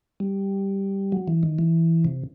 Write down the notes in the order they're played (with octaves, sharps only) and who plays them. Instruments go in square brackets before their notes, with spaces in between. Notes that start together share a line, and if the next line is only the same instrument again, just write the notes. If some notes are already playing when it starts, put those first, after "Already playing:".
[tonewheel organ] G3
F#3
E3
D#3
E3
C3